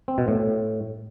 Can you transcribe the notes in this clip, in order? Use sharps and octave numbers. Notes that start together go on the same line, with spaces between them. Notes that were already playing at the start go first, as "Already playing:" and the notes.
C4
B2
A2